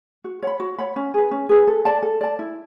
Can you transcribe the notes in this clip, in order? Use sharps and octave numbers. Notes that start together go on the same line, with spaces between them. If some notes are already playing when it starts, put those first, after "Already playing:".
F#4
C#5 F#5 B5
F#4
C#5 F#5 B5
C#4
G#4 B4
C#4
G#4 B4
A4
D5 A5
A4
D5 A5
E4